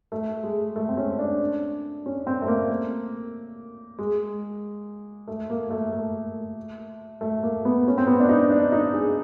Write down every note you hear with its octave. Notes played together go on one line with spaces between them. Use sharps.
A3
G#3
A3
C4
C#4
D4
C#4
C4
A3
A#3
G#3
A3
A#3
A3
A3
A3
A#3
B3
C#4
C4
B3
D4
D#4
D4
D#4
G#4